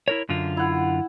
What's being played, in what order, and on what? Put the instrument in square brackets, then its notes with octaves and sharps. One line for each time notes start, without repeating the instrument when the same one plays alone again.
[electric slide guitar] E4 A#4 C#5
F#2 D3 F4
[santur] E4 F#5